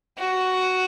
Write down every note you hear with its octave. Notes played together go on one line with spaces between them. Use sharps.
F#4